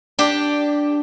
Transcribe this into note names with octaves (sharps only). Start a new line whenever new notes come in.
D4 G4